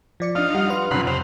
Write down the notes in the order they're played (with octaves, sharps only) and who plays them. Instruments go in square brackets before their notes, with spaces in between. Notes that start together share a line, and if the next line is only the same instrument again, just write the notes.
[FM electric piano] F3 D5 C#7
[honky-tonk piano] D4 [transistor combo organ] D#4 F4 F5
[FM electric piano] G3 [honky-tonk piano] F#5 F7
[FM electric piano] B4 C6 F6
[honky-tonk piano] B1 F2 [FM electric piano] C#3 [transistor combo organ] F#5 B5 C6
[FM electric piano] F2 [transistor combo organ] C3 C5 [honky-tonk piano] F7